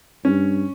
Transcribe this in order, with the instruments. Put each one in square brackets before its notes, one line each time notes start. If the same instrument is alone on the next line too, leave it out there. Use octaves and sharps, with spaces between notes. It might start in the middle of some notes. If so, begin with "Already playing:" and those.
[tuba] G2 [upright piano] C#4